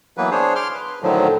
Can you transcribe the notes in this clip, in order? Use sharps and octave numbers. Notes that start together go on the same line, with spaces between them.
E3 F#3 A#3 B3 B4
D4 G#4 C5 C#5
C6 D6 F6
B4
A2 D3 D#3 F3 F#3